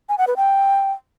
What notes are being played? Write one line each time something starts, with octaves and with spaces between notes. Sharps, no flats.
G#5
F#5
B4
G5